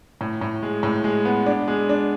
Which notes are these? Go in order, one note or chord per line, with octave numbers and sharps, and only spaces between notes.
A2
A2
G#3
A2
G#3
B3
D4
G#3
D4